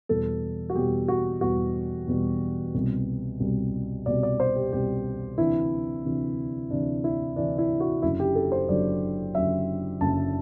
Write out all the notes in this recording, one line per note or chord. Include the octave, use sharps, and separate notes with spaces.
E2 B2 G3 A4
F#4
E2 B2 G3 G4
F#4
E2 B2 G3 F#4
E2 B2 G3
C2 B2 G3
C2 B2 G3
C2 B2 G3 D5
D5
C5
G4
C2 B2 G3 G4
D2 C3 E3 E4
D2 C3 E3
D2 C3 E3 D4
E4
D2 C3 E3 D4
E4
F#4
F#1 F#2 D3 F#3 E4
G4
A4
C5
F#1 F#2 D3 F#3 D5
F#1 F#2 D3 F#3 E5
F#1 F#2 D3 F#3 A5